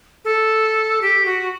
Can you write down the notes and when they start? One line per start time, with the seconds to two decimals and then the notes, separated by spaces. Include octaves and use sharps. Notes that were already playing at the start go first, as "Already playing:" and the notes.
0.25 A4
1.02 G4
1.26 F#4